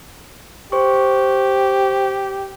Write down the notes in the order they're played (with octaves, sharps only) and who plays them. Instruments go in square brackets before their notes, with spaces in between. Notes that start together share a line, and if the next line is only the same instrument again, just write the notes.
[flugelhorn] G4 [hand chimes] C5 C#6